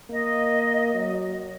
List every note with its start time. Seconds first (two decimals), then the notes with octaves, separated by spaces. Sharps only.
0.10 A#3 D#5
0.94 F#3